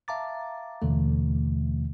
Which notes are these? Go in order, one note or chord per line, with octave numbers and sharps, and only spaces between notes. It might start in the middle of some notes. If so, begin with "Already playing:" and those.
E5 F5 A5 A#5 D6 A6
D#2 B2 D3 E3 A3